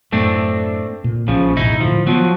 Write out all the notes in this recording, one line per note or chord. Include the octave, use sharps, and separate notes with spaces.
F#2 A2 A3 C4 D4
A#2
A#1 C#3 F3
E1 A2 C#3 D#4 E4
A2 D3 D#3 F3
F3 F#3 B3